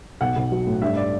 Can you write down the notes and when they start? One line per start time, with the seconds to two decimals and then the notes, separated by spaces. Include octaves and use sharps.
0.21 B1 F#5
0.36 B1
0.52 F#3
0.67 A2
0.81 G2 E5
0.96 D5